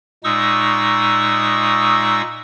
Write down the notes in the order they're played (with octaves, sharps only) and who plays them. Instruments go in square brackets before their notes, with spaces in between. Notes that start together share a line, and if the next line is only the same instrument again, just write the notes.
[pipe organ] A#2 G#3 D#4 C#6 D#6 E6